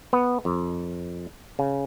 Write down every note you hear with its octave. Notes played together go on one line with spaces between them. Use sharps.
B3
F2
C#3